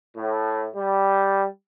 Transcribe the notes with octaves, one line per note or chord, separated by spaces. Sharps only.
A2
G3